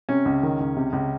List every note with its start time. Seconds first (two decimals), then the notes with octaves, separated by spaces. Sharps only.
0.09 C3 C#4
0.25 C#2
0.43 D#3
0.60 C#2
0.76 C3
0.93 C#2